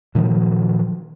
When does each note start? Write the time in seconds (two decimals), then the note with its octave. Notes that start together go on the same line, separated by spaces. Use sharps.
0.15 A#2 D#3 F3 F#3